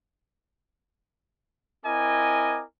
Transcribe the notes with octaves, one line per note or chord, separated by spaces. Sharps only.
C4 E4 A#4 D#5 G#5 D6